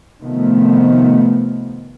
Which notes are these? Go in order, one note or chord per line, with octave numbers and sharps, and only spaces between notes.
C3 D#3 F3 A3 B3